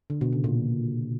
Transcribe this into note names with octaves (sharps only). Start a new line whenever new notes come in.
D3
B2
C#3
A#2